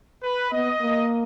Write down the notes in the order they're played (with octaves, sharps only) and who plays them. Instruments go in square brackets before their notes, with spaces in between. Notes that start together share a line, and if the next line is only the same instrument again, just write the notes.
[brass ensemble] B4
[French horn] B3 [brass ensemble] D#5
[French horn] A#3